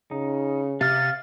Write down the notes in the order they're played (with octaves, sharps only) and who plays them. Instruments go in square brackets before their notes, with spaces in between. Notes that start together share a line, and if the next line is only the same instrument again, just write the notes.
[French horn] C#3 [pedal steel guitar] D#4
[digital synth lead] C3 [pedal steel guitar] F5 F6 [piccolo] A6